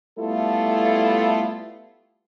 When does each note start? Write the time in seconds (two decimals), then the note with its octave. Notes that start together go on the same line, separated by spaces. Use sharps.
0.18 G3 A3 B3 E4 F4 A4